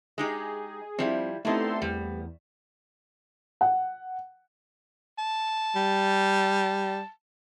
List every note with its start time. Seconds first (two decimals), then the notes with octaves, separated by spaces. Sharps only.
0.18 G#3 D#4 G4 G#4
0.99 F3 G3 C4 E4
1.45 A3 B3 C4 D#4 E4 G4 A4 C6
1.82 E2 G3
3.61 F#5
5.18 A5
5.76 G3